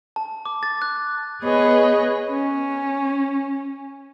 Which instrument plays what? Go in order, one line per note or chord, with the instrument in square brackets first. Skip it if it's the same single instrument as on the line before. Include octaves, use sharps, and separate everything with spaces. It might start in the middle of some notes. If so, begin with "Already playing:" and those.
[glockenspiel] A5
D6
A6
F#6
[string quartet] B3 G#4 B4 C#5 D#5
C#4